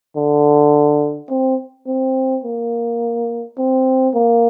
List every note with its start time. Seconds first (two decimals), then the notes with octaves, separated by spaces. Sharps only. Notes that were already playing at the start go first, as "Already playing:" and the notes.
0.16 D3
1.30 C4
1.87 C4
2.44 A#3
3.58 C4
4.15 A#3